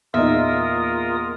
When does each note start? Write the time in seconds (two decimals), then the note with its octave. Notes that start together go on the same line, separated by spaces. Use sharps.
0.14 E2 A#2 D#4 F4 A#4 E5 D#6